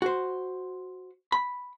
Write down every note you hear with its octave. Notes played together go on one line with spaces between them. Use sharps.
F#4 C5
B5